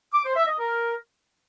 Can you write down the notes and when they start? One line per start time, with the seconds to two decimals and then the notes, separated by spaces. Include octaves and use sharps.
0.14 D6
0.25 C5
0.36 E5
0.48 D#5
0.59 A#4